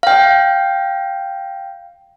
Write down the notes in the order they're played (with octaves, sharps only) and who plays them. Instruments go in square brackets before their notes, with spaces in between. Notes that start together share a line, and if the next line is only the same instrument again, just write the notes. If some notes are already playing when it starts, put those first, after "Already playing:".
[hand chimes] F5 G5